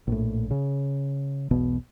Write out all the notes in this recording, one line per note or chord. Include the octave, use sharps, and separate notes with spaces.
A#1 A2
C#3
E1 B1 B2 B3